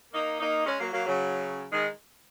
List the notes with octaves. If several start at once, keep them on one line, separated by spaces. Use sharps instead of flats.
A#3 D#4
A#3 D#4
G#3 C#4
F#3 A#3
F#3 A#3
C#3 F#3
D#3 G#3